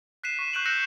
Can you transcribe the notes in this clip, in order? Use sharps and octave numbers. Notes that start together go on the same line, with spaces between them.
F#6 B6 C7 D#7 E7
C#6
C#6 F#6 G6 C7 D7 F#7
E6 F#6 G6 A#6 C#7 E7